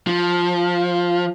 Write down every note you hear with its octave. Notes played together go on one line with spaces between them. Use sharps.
F3